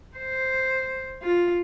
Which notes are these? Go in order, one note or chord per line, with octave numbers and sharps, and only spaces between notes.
C5
F4